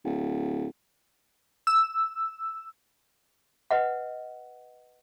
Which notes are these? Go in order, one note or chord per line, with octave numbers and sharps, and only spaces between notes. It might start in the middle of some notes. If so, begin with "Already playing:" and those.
D1
E6
B4 D#5 F#5